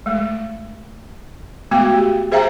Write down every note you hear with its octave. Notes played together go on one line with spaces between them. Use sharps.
G#3 A3
G#3 A3 B3 F#4 F5 G5
G4
G#4 C5 E5 F5 G5 A#5